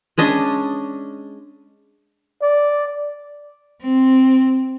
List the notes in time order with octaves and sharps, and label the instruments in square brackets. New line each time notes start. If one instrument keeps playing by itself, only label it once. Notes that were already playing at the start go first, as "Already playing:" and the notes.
[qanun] G#3 C#4 D4 D#5
[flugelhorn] D5
[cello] C4